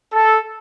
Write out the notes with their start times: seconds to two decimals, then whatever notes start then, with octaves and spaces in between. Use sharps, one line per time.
0.13 A4